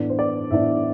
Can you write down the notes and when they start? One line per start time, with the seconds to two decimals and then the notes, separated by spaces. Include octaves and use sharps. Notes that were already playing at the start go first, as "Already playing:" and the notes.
Already playing: A2 E3 B3 D4
0.10 C5
0.19 D5
0.51 A2 E3 B3 D4 E5